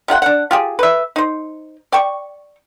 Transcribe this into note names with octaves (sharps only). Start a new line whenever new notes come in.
C3 F4 F#5 G5
D4 F#5
F4 G4 G#4
B4 E5
D#4 C5
D5 G5 C#6